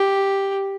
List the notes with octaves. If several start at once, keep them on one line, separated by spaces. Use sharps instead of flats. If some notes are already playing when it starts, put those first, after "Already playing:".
Already playing: G4